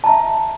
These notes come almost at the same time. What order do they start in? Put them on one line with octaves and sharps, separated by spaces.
A5 A#5 E5